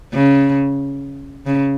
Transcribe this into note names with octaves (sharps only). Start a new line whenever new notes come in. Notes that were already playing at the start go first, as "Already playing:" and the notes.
C#3
C#3